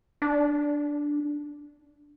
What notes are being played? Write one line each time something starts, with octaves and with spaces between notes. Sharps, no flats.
D4